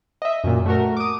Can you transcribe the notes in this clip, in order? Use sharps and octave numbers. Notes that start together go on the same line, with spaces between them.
D#5 E5
F#2 A#2
A3 F#4 A#4
D6 D#6